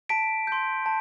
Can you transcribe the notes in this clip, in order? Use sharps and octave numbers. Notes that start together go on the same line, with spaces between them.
A5 B6 D7
C6 G6
A5